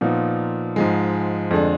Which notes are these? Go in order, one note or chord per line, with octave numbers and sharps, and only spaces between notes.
A#2 F3 B3 D#4
G#2 F3 G#3
F2 D3 G#3 D4